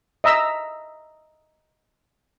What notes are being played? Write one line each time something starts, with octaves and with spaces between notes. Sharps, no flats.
D#5 E5 A#5 E6